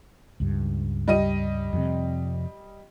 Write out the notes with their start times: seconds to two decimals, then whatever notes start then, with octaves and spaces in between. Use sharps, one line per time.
0.40 C#2 G2
1.08 G3 D#5 D#7
1.73 F2 C3